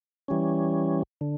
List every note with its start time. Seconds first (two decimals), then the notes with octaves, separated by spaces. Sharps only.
0.28 E3 G3 C#4
1.21 D3